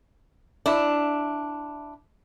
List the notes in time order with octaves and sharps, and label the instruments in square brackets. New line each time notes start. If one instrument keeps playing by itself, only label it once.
[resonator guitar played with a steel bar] D4 E4